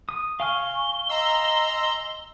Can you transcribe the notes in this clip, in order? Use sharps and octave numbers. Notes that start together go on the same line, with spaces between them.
D#6
F5 G#5 C#6 F6 G7
D#5 A#5 C6 E6